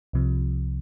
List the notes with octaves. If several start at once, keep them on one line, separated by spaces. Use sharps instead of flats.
C2 C3 F3